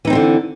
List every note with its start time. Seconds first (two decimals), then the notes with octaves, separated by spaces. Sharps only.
0.05 E3
0.07 D#4
0.10 C4
0.13 G#3
0.15 D3